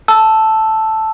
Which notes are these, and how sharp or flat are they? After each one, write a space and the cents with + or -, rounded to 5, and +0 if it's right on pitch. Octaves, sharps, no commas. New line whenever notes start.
A5 +0 E6 +0